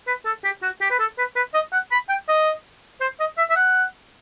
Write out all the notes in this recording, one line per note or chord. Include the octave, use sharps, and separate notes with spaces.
B4
A4
G4
F#4
G4
B4
A4
B4
B4
D#5
F#5
B5
G5
D#5
C5
D#5
E5
E5
F#5